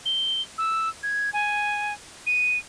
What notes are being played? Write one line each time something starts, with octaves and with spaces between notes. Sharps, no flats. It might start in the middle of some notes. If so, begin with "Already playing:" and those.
G7
E6
G#6
G#5
D#7